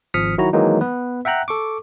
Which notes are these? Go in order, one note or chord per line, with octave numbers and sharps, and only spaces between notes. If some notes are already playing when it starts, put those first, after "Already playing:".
G#1 F3 D#6 F6 B6 C#7
D#3 F#3 E4 F#4 A#5
D#3 E3 F#3 G#3 A#3 D#4
B3 B4
E5 F#5 G5 A#5 F#6
A4 C#6 D6